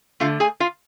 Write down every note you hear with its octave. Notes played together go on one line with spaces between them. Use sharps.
D3 A3 F4 F5
G#4 G#5
F4 F5